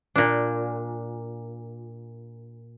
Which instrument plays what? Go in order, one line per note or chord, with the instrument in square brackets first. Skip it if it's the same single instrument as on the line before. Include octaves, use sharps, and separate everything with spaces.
[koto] A#2 D4